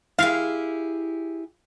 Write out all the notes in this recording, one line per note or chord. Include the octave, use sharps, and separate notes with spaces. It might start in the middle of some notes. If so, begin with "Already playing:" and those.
E4 G4 G#4 F5